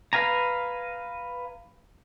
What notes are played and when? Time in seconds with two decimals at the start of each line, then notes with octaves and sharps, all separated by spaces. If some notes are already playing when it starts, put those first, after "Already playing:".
0.13 B4 F5 G#5 A#5